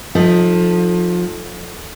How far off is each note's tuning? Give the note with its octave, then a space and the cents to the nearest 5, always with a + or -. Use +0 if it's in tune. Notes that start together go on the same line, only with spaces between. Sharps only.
F3 +25 A3 +0 D#4 -5